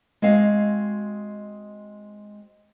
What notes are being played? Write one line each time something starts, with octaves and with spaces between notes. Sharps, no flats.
G#3 C4 F#4 F5